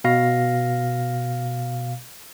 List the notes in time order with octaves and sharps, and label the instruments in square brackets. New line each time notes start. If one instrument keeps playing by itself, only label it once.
[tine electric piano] B2 F5 A#6